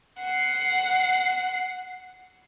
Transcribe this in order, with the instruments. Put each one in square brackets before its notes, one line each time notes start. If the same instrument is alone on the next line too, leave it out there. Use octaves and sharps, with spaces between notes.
[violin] F#5 C7